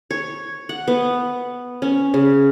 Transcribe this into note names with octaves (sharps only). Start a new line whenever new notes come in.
C#5
F#5
B3
C#4
C#3